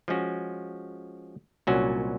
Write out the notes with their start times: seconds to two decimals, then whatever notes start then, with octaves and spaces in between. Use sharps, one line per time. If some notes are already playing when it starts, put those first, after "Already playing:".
0.08 F3 G#3 C#4 F#4
1.67 C2 A#2 F#3 C#4 F#4